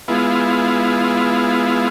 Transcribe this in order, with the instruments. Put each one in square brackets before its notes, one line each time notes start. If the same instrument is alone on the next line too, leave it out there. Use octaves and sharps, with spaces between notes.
[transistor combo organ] G#3 B3 E4 F4